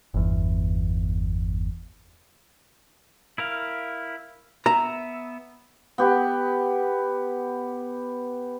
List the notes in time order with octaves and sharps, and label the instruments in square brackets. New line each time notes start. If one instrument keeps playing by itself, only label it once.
[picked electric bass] G1 E2
[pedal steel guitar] E4 A#4 F5
[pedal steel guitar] B3 E5 [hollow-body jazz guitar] A#5
[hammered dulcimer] B3 G4